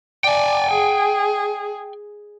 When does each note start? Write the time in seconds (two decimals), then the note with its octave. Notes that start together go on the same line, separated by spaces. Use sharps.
0.24 D5 G5 G#5
0.70 G#4